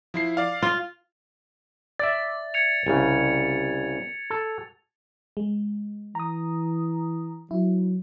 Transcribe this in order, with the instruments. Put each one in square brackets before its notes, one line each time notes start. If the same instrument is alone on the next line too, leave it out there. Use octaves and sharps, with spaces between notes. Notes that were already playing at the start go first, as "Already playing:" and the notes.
[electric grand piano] F3 E4 C7
D5 F5
[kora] F4
[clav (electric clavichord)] D5 E5 [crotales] A6
[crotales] G#6 C#7 F7
[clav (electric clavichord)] C2 C#3
A4
[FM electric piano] G#3
[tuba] E3 [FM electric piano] A#5 D#6
[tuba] F#3 [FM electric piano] E4